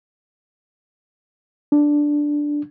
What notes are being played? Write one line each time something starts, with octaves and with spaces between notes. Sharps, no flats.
D4